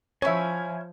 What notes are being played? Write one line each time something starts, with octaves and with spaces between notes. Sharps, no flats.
F3 C#4 E4 C#5 E5 G#5